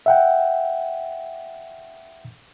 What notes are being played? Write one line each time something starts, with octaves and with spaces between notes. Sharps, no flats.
E5 F#5 G5